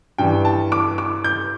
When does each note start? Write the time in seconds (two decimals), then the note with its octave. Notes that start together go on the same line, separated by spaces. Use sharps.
0.18 G2 E3 G5
0.45 A5
0.72 D6
0.98 D6
1.24 G6